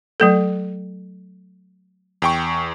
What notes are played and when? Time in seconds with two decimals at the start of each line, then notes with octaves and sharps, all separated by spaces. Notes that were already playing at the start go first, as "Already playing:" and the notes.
0.20 F#3 A3 A4
2.22 E2 G5 C#6